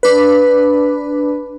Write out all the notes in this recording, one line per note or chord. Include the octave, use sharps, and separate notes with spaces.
D4 B4